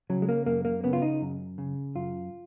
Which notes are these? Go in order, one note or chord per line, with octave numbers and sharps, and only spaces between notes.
C#3 F#3
G#3
A#3
F#2 A#3
A#3
C#3 B3
F4
D#4
F#2
C#3
F#2 F4